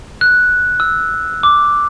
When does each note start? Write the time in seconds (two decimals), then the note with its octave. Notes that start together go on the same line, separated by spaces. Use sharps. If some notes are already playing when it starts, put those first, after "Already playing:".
0.21 F#6
0.80 E6
1.43 D6